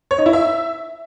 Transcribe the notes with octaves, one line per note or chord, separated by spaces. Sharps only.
C#5
D#4
E4
E5